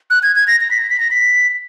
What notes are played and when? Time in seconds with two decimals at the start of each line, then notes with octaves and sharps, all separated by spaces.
0.10 F#6
0.23 G#6
0.36 G#6
0.48 A#6
0.61 A#6
0.71 B6
0.80 A#6
0.90 B6
1.00 A#6
1.11 B6